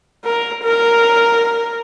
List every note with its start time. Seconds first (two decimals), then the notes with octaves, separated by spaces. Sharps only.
0.25 A#4
0.64 A#4